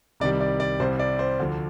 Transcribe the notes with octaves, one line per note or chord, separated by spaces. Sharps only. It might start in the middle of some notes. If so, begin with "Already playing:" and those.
C2 C3 D#3 G3 D5
D5
D5
C2 C3 G3 C5
D5
C5
D2 D3 F3